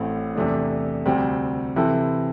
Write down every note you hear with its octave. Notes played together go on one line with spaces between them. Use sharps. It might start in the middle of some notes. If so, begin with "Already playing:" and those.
Already playing: A1 A2 A3 C4
E2 C3 A3 D4
D2 C3 G3 C4
C3 E3 C4 E4 A4